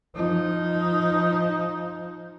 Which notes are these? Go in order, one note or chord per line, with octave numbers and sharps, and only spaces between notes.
F3 D#4